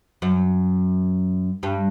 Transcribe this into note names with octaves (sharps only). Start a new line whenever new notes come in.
F#2
G2